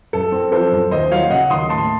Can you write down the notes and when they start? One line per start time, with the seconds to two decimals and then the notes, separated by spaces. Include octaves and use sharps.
0.13 F#2 A4
0.32 C4
0.52 F3 A4 C5
0.72 F#2
0.91 D#2 C5 D#5
1.11 F#3 C#5 F5
1.30 C#3 D#5 F#5
1.50 D#2 C6 D#6
1.69 A2 A5 C6